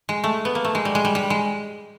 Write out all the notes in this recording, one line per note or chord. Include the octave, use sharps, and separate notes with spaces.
G#3
A3
B3
A#3
A3
G#3
G3
G#3
G3
G3
G#3